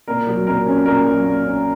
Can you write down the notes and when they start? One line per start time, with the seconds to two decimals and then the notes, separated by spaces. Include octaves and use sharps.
0.08 A#2 A#4
0.27 F#3
0.47 A#2 A#4
0.66 C#4
0.85 A#2 A#4
1.05 F#3
1.25 A#2
1.44 C#4